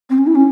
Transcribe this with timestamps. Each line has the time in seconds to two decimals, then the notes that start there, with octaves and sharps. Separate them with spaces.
0.10 C4
0.18 C#4
0.27 E4
0.35 C#4